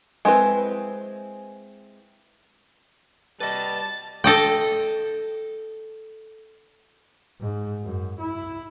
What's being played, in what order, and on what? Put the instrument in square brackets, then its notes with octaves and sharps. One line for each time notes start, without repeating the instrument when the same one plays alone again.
[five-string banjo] G#3 C4 E4 B4
[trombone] G3 [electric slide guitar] B4 D#5 [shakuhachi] A5 [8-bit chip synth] A6
[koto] A4 D#5 G5
[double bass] G#2
F#2
E4